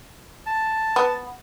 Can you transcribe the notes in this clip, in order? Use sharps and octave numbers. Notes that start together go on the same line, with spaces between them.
A5
B3